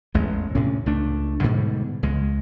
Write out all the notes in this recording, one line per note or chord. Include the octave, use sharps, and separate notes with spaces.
A1 E2 G#3
D2 A2 C3 C#4
C#2 A3 D4
G#2 B2 D3 G3
C#2 G#3